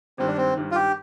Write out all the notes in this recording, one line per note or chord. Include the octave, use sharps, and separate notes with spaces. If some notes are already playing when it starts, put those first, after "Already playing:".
G#1 G2 D#3 C4
D4
C4
G#1 G2 D#3
F4
G4